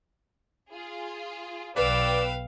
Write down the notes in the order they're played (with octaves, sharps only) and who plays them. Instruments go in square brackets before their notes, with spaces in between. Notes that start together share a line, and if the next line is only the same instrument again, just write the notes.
[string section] F4 G#4
[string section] B1 G5 E6 [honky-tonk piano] B4 [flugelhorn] D5 [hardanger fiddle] F5